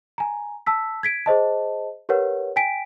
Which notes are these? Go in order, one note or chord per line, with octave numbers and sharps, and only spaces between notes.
G#5 A#5
A5 E6 B6
G#6 B6 D7
G#4 C5 D#5 A5
G4 A#4 B4 C#5 F#5
G5 G#5 B6 D7